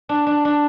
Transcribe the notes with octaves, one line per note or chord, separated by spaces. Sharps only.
D4
D4
D4